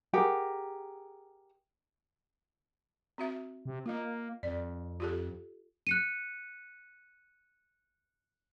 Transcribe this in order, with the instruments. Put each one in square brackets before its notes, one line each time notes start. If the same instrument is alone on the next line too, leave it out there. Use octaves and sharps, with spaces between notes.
[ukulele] G4 G#4 A#4 F#5
[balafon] C4 F#4 E5
[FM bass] C3
[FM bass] A#3 [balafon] F4 D#5
[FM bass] F2 [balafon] D5
[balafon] F4 G4 A4
[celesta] F#6 C#7 D#7